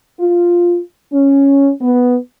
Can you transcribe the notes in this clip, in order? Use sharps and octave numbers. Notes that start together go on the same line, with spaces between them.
F4
C#4
B3